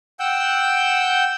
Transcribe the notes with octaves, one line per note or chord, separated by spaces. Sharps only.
F#5 G5 E6 G6